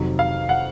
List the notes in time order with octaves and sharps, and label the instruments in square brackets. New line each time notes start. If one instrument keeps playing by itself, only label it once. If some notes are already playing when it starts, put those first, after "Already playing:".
Already playing: [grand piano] F2 C3 D#3 F#3
F5
F#5